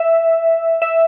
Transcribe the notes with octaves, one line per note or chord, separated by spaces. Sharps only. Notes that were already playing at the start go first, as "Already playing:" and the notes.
Already playing: E5
E5